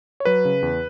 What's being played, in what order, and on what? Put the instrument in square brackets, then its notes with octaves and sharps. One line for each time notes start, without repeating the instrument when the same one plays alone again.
[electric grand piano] C#5
F#3 B4
C#3
E2